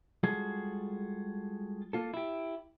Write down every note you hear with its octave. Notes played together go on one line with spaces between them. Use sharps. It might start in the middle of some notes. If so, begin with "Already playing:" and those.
G3 G#3 F4 F#4 G#4 A4
A#3 F4 A4
E4 G4